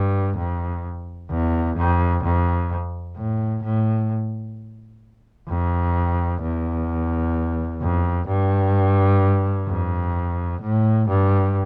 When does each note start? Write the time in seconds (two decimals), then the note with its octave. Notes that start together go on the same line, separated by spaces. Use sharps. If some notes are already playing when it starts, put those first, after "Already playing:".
Already playing: G2
0.37 F2
1.30 E2
1.77 F2
2.24 F2
3.16 A2
3.63 A2
5.49 F2
6.43 E2
7.82 F2
8.28 G2
9.68 F2
10.61 A2
11.08 G2